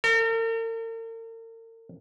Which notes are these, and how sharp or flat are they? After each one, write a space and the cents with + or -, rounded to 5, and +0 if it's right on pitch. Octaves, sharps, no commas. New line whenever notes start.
A#4 -45